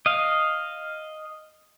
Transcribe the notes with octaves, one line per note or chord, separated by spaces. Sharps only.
D#5 F5